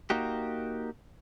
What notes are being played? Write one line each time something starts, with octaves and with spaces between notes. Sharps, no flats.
A#3 D#4 F#4 G4